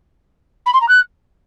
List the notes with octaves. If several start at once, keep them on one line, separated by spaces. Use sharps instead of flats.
B5
C6
A#5
F#6